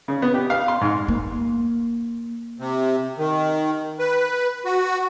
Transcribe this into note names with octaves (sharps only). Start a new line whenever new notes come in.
C#3
B3
G4
F5
C6
G#2
A#3
C3
D#3
B4
F#4